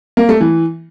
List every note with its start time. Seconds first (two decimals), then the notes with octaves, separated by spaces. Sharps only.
0.17 A#3
0.29 A3
0.41 E3